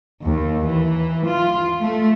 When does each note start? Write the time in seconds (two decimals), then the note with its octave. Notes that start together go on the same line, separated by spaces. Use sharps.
0.24 D#2
0.68 E3
1.28 F4
1.82 A3